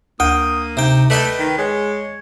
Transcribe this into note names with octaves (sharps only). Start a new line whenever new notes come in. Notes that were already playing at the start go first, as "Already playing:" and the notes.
D2 A#3 G5 D#6
C3 D#4 G5
A3 B4 D5 D#5 G5
D#3
G#3 C#5